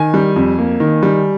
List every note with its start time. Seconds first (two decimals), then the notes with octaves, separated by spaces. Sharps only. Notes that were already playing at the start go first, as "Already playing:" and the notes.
Already playing: D#3 G#5
0.14 G3
0.36 F2
0.59 A#3
0.80 D#3
1.03 G3